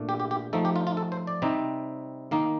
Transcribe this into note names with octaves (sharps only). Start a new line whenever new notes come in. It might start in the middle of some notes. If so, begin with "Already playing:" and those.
Already playing: A#2 A3 D4
G4
G4
G4
F3 A3 D#4 A4
G4
F4
F4
A4
C5
D5
C3 G3 C4 D#4
D#3 A#3 D#4 F5